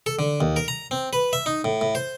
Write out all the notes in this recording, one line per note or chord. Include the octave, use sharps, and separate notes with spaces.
A4
D3
D#2
A#4
A#5
C4
B4
E5
D#4
A2
A2
C5